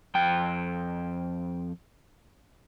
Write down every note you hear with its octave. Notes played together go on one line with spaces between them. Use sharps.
F2 G5